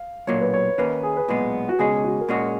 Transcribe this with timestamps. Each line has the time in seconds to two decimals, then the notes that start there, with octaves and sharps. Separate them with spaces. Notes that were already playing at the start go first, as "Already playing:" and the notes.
Already playing: F5
0.27 B1 A#2 F#3 A#3 C#5
0.41 B4
0.54 C#5
0.78 D#2 D#3 A#3 C#4 B4
1.03 G#4
1.17 B4
1.28 B1 A#2 G#3 B3
1.69 F#4
1.79 C#2 B2 G#3 C#4 G#4
2.04 F#4
2.21 A#4
2.29 A#2 G#3 C#4 F#4 G#4